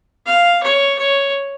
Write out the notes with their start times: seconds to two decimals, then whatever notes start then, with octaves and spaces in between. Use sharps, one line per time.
0.26 F5
0.63 C#5
0.98 C#5